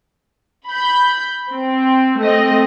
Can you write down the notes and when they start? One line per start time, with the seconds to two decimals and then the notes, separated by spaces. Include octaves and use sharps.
0.68 B5 G6
1.51 C4
2.19 A3 C4 D#5